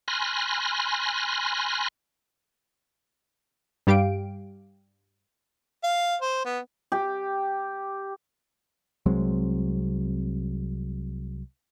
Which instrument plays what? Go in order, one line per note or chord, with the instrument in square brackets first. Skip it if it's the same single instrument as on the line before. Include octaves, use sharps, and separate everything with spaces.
[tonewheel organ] G#5 B5 C6 F6 F#6 A#6
[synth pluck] G2 G3 G4 F5 G5 D7
[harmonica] F5
C5
B3
[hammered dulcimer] G4
[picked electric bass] C2 F#3 G#3 C4